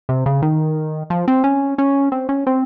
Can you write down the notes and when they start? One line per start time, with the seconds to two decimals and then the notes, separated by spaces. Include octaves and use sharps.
0.09 C3
0.26 C#3
0.42 D#3
1.10 F3
1.28 C4
1.44 C#4
1.78 C#4
2.12 C4
2.29 C#4
2.47 C4